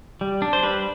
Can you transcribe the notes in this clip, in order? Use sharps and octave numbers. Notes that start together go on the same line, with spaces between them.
G3
D4
C5
G3 B4